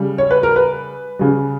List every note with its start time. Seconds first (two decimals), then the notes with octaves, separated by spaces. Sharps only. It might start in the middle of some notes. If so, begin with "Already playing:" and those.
Already playing: C#3 G3
0.18 C#5
0.31 B4
0.43 A#4
0.56 B4
1.19 C#3 G3